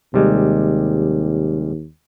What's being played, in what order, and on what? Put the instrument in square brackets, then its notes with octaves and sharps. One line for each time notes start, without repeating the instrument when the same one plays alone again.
[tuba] D#2 [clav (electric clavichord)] C3 G3 G#3